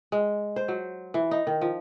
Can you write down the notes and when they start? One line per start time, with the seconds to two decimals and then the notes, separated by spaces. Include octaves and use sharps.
0.12 G#3
0.56 C5
0.68 F#3
1.14 E3
1.31 D#4
1.47 D#3
1.62 F3